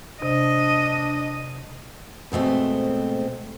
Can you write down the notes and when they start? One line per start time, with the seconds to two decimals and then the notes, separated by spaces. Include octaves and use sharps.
0.22 C3 D4 D#5
2.32 G#2 B2 A3 C4